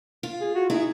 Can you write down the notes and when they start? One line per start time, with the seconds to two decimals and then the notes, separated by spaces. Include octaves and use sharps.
0.23 F4
0.41 G#4
0.55 F#4
0.70 D#4 E4 G#4